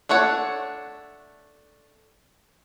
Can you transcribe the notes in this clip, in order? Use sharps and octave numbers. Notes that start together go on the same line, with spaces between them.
A3 D4 C#5 F#5